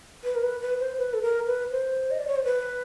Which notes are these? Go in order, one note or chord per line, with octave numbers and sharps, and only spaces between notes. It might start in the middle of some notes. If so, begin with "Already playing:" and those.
B4
A#4
B4
B4
C5
B4
A4
A#4
B4
C5
D#5
D5
C#5
C5
B4